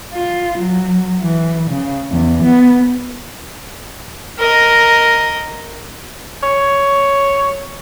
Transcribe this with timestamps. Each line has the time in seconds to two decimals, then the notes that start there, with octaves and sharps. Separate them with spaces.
0.14 F4
0.58 F#3
1.21 E3
1.71 C#3
2.11 E2
2.43 B3
4.38 A#4 D#5
6.43 C#5